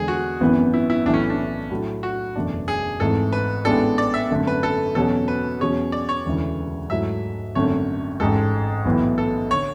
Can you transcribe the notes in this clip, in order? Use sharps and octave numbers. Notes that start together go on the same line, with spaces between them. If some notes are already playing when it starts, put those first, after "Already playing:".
Already playing: E2 D3 G#3 G#4
F#4
G#1 F#2 E3 B3
E4
E4
B1 A2 E3 A3 D4 E4
C#4
D4
A2 F#3 A3 D4
F#4
F#1 E2 B2 A3 D4
G#4
G#1 G#2 E3 A3 A4
B4
A1 A2 G#3 B3 D4 A4
D5
E5
G#1 F#2 D3 A3
B4
A4
E2 B2 F#3 C#4 F#4 A4
B4
E2 B2 F#3 C#4 G#4 C#5
D5
C#5
E1 D2 C#3 E3
G#2 F#3 A3 E4 E5
G#1 F#2 D3 A3 C#5
A1 G#2 G#3 A4
B1 A2 E3 B3 E4
A4
D3 C#5